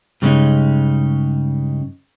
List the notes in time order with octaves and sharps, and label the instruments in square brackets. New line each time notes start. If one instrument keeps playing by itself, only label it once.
[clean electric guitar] G2 C#3 G#3 C4 C#4 D#4